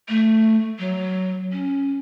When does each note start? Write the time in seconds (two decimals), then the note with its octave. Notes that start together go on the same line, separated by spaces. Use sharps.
0.09 A3
0.79 F#3
1.52 C#4